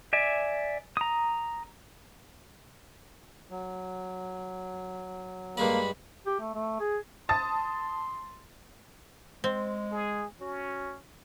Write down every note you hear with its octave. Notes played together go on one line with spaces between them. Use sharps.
D5 E5 G#5
A#5 D#6
F#3
G2 G#3 A#3 D5 B5
G4
A3
A3
G#4
A5 C6 D#6 A6
G#3 C4
G#4
C#4 F#4